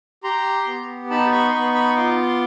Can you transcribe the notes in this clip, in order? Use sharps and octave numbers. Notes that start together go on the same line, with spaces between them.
G4 A#5 C6
B3
D#4 A5 B5
B5 C#6
C6
B3 B5 C#6
B5 C#6
F4 C6 D6